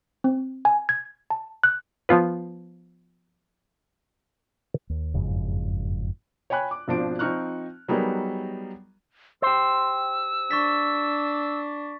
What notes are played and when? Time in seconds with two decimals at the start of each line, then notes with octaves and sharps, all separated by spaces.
0.24 C4
0.65 G#5
0.89 G#6
1.30 A5
1.63 F#6
2.09 F3 B3 F4 B4
4.89 D#2
5.14 F#1 F2 G#2 C#3
6.50 C#5 G5 G#5 B5 F#6
6.71 D6
6.88 G#1 B2 F3 D4 C5 D7
7.19 F3 C4 D#4 C#6 F6 F#6
7.88 F#3 G3 B3 D#4 G#4 A#4
9.42 G4 C5 E6
10.51 D4 C#6 A6 B6